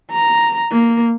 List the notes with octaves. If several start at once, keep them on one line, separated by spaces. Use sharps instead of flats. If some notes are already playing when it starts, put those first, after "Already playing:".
A#5
A#3